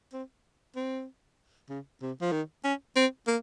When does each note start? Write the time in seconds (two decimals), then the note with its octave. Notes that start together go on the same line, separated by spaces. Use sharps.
0.13 C4
0.76 C4
1.69 C#3
2.02 C3
2.21 F3
2.32 D#3
2.64 C#4
2.96 C4
3.27 A#3